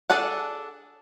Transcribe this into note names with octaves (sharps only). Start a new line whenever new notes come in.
D4 G#4 A4 D5 F#5